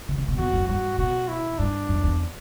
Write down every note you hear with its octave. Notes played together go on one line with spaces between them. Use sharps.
D3
C#3
B2
E2 F#4
F#2
G2 F#4
B2 F#4
E4
G2 D4
F#2
E2